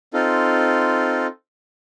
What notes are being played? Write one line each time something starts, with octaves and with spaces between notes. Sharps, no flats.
C4 D#4 F4 A4